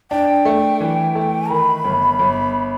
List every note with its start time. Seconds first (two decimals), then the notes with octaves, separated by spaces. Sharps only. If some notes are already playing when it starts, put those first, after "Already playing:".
0.11 D4 G5
0.45 A3
0.80 E3
1.15 A3
1.50 D#3 B5
1.85 G1
2.19 G1